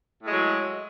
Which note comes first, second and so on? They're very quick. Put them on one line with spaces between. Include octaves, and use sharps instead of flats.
A2 G#3 F#3